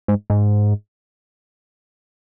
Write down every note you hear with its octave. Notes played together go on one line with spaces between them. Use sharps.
G#2
G#2